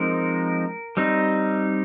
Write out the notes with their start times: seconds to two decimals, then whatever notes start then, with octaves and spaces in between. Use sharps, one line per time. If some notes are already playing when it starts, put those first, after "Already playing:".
Already playing: F3 G#3 C4 D#4 A#4
0.97 G3 C4 D#4